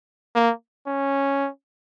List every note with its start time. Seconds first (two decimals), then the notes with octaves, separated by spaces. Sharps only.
0.36 A#3
0.87 C#4